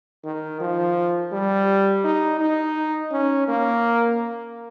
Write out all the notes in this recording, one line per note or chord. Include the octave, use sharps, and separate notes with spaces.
D#3
F3
G3
D#4
D#4
C#4
A#3